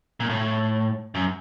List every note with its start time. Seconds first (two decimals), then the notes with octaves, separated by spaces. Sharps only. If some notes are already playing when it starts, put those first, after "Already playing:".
0.20 A#2
0.30 A2
1.15 F#2